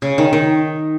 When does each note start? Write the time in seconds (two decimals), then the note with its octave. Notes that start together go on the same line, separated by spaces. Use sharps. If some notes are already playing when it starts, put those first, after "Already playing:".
0.02 C#3
0.18 D#3
0.33 D#3